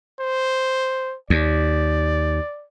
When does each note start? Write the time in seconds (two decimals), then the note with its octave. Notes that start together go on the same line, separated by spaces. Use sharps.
0.21 C5
1.30 D#2 D5